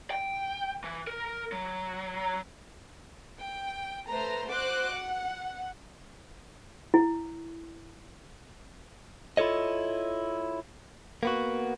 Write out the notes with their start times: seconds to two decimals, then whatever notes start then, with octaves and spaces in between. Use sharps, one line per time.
0.11 G5
0.84 E3
1.07 A#4
1.52 F#3
3.40 G5
4.07 A3 B4 C5 A#5
4.48 F#4 C5 D6 F#6
4.92 F#5
6.94 E4
9.37 E4 F4 A4 C#5 D#5
11.23 A#3 B3 F#4